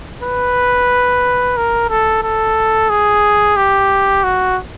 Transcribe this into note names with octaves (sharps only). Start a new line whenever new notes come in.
B4
A#4
A4
A4
G#4
G4
F#4